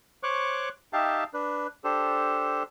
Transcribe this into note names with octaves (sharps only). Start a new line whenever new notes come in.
C5 C#5 C#6 D6 F#6
D#4 G4 E5 F5 G5 A5
D4 B4
D4 G4 A4 C5